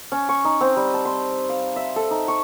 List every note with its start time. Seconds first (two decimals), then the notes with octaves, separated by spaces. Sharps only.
0.12 C#4
0.29 C#6
0.45 D#4
0.61 C4
0.76 G3
0.94 A5
1.05 C6
1.49 F5
1.76 E5
1.96 A4
2.11 D#4
2.28 C#6